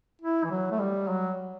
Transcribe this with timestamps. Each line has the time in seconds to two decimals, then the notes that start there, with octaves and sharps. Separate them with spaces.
0.22 E4
0.44 E3
0.51 F#3
0.71 A3
0.80 G3
1.09 F#3